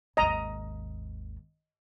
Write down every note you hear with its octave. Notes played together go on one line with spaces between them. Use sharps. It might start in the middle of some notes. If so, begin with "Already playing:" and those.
G#1 D#2 D#5 A#5